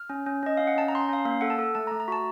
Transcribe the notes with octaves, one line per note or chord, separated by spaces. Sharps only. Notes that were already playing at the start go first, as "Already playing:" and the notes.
Already playing: F6
C#4
C#4
C#4 D#5
C#4 F5
F#5
C#4 A5
A#5
C#4 C6
A#5
C#4 F5
A#3 F5
A4 F#5
A5
A4
A3 A5
A#5
A3
A#5
F#4 A5